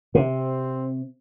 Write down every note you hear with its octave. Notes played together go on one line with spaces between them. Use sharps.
C3 C4